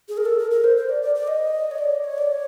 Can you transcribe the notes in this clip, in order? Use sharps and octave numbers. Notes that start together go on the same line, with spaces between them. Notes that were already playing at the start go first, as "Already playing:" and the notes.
G#4
A#4
A4
A#4
A#4
C5
C5
D5
D5
D5
D#5
C#5
D5
C#5
D5
C#5